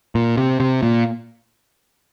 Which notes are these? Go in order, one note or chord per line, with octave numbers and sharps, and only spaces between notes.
A#2
C3
C3
A#2